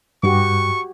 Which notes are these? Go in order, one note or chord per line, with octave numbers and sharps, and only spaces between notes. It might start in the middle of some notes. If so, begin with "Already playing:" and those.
G2 F#4 G4 C#6